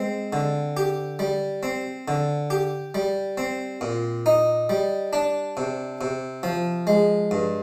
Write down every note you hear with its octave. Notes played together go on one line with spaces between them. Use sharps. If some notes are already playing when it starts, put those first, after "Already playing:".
Already playing: G#3 C4
D3
G4
G3
C4
D3
G4
G3
C4
A#2
D#4
G3
D4
C3
C3
F3
G#3
G2